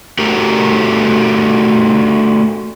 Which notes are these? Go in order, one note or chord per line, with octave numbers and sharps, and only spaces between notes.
A3 F#4 G4 A4 A#4